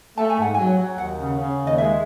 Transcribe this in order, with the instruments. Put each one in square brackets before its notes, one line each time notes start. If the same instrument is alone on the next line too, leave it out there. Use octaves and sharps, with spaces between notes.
[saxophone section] A3 [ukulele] A5
[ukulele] G#5
[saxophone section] G#2 [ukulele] F#5
[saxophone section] F#3 [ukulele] G#5
[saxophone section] F#3
[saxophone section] D#2 [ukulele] F#5
[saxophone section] C#3
C#3
D#2
[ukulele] D#5
[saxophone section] G#3 [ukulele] E5